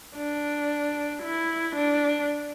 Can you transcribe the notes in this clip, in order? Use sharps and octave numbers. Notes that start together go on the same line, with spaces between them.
D4
E4
D4